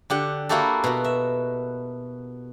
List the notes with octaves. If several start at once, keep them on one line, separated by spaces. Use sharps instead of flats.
D3 G4 F#5
A#3 E4 F#4 G4 A4
B2 F#4
E5